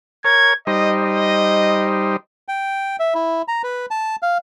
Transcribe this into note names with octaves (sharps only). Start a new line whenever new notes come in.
A#4 C#5 G#6
G3 D#4 C5 D#5
D#5
G5
E5
E4
A#5
B4
A5
F5